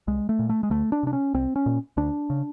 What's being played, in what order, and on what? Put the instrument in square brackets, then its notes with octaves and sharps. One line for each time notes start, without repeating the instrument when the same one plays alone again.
[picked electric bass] C2 G#3
A3
A#2
A3
G#3
D2 A3
D4
C3 D4
C#4
C2 C4
C#4
A#2
D2 D4
C#3